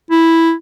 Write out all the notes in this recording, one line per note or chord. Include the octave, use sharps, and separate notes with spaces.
E4